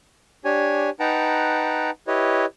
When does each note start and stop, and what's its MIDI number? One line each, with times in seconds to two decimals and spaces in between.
0.45 0.90 62
0.45 0.90 67
0.45 0.90 73
0.45 0.90 80
1.00 1.91 63
1.00 1.91 71
1.00 1.91 78
1.00 1.91 79
1.00 1.91 81
1.00 1.91 82
2.07 2.45 64
2.07 2.45 67
2.07 2.45 71
2.07 2.45 73
2.07 2.45 75